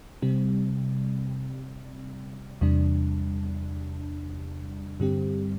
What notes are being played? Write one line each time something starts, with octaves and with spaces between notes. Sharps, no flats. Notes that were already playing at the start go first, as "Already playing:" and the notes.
C3 G3 C4
E2 C3 G3 D4
G2 D3 G3 C4 G4